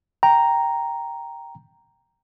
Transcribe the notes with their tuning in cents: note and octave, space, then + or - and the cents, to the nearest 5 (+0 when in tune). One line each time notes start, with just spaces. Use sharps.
G5 +0 A#5 +0